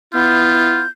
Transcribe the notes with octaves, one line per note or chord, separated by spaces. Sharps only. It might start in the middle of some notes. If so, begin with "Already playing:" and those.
B3 E4 F4 G6